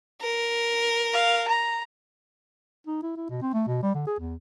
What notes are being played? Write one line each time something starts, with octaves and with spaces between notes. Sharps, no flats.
A#4
F5
A#5
D#4
E4
E4
B2
C4
A3
B2
G3
D3
G#4
E2